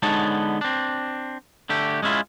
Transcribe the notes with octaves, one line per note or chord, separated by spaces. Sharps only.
D3 G#3 B3 D#4 C#5 A5
C4 D4
D3 A3 G4
G#3 C#4 E4 F4